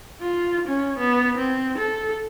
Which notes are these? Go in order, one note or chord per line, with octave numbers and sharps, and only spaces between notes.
F4
C#4
B3
C4
A4